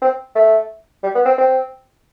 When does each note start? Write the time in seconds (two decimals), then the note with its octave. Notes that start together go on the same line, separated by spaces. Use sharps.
0.02 C4
0.35 A3
1.03 G3
1.15 B3
1.26 C4
1.38 C4